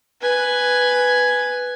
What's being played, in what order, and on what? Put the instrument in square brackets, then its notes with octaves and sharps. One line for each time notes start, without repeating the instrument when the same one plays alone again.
[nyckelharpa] B4 G#5